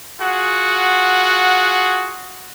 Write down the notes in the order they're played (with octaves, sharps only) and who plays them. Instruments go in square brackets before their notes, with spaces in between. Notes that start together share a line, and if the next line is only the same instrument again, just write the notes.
[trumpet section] F4 F#4 G#4 F#5